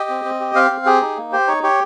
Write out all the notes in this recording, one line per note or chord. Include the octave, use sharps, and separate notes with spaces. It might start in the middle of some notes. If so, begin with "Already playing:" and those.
Already playing: G4 D#5
C4
C4
G4
C4 F5
C4
G4 G#4
D#4
A#3
G4 C5
D#4 C#5
G4 C#5